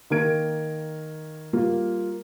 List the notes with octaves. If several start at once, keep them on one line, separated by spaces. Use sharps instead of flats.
D#3 A#3 A#4 G#6 D7
G3 A#3 F4